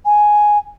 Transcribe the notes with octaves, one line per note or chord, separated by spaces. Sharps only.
G#5